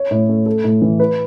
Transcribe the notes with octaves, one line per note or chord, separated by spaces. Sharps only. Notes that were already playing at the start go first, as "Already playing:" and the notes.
Already playing: C#5
A2
A3
A4
A2
E3
B4